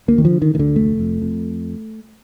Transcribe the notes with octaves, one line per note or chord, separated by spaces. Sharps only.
D2 A#3
D#3
F3
D3
D#3
D2 D#3
D3
F1 A3
F2
F2